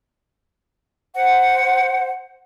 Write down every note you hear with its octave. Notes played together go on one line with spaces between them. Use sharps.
C5 F#5